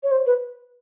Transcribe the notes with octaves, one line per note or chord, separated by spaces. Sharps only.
C#5
C5
B4